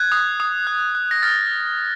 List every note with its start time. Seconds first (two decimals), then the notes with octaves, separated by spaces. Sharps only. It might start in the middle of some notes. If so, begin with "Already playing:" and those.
Already playing: F#6 G#6
0.12 D#6
0.40 D#6
0.67 F#6
0.95 F#6
1.11 A#6
1.23 F6 A6